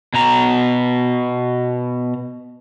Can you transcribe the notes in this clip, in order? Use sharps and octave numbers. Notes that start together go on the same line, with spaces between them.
B2 A#5